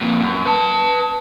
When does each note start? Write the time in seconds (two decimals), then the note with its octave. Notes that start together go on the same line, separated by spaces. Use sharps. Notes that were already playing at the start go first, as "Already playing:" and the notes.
0.01 F2 A#2
0.21 F#2
0.45 B4 A5